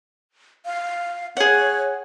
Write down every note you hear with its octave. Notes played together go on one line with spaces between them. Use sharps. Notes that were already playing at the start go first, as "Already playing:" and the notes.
F5
G#4 C#5 F#5